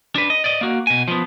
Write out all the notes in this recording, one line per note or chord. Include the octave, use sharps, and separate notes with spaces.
D4 B4
D#5
D5 D#5
A#3 F#4
B2 G#5
F3 B3